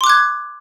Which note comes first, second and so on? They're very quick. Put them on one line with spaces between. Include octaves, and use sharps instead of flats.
C6 D6 F#6 G#6